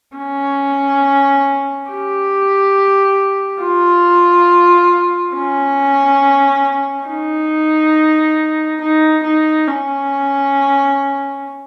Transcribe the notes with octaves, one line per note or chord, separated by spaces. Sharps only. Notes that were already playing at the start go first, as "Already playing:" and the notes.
C#4
G4
F4
C#4
D#4
D#4
D#4
C#4